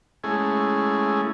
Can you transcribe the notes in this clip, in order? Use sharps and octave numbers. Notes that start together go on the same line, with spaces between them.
G#3 A3 C#4 E4 G#4